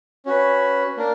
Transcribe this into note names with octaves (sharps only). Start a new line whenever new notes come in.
C#4 F#4 B4
A#3 D4 A#4